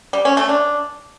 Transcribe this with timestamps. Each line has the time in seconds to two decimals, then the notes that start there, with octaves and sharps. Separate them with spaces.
0.13 G3
0.25 C#4
0.37 A3
0.49 D4